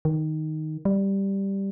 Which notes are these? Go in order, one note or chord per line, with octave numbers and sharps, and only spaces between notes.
D#3
G3